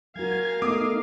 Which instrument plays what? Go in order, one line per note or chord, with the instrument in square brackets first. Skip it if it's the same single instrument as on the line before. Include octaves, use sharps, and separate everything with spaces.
[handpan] F#3 F#4 [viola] A#4 F5 [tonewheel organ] G#5 G#6
[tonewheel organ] A3 D#4 [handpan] B3 [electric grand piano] D6 D#6